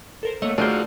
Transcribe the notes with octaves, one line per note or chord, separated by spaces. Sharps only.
A4 A#4 C5
A3 A#3 C#5 D#5 F#5
A3 D4 D#4 F4 F#4 G#4 A#4 C5